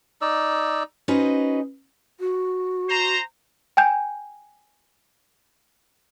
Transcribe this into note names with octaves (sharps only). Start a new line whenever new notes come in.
D#4 D5 E6
C#4 D#4 F#4 B4 C5 D#5
F#4
C5 A#5
G5 G#5 G6